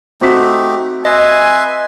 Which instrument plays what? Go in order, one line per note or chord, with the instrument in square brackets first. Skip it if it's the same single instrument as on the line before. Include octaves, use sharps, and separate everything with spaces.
[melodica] A3 D#4 G4 [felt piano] C4 F#4 B6
[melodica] B4 E5 C6 [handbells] D#5 [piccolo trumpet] G#5